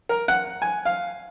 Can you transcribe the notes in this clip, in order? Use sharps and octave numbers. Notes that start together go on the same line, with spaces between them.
A#4
F#5
G#5
F5